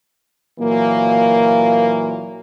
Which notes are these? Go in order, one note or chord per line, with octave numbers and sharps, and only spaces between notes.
A#2 E3 F#3 A#3